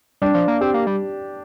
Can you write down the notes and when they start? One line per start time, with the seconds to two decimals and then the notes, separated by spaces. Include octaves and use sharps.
0.22 G3 D4
0.34 F3
0.48 A#3
0.61 C4 G4
0.74 A#3
0.87 G3